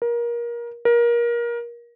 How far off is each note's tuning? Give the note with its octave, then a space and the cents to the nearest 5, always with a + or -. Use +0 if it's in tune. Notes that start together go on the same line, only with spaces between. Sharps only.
A#4 +25
A#4 +25